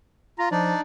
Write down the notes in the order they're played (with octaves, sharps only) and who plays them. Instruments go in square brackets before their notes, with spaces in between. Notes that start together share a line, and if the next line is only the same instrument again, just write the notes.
[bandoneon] F4 [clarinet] A#5
[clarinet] F3 [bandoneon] D4 D#4 D5